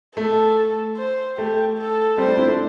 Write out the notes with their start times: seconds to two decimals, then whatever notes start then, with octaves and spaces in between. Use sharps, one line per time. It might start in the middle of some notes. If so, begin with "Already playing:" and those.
0.17 A3 A4
0.97 C5
1.38 A3 G4
1.78 A4
2.18 G3 C4 C5
2.28 A3 D4
2.37 C4 E4
2.48 A3 D4